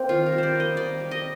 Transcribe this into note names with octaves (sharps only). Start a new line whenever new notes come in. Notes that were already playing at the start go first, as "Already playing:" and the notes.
Already playing: A#3 C4
D#3 F4
A#4
G3
C5 D5
A#3
D#5
D#3 D5
G3
D#5